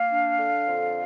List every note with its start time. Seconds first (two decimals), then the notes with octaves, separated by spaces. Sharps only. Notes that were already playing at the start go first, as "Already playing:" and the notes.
Already playing: A#3 F5
0.11 D4
0.38 D3
0.67 F2